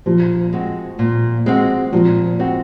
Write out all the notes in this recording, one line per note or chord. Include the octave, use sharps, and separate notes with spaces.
A#2 F3
G#3 C4 F#4
A#2
G#3 C4 F#4
A#2 F3
G#3 C4 F#4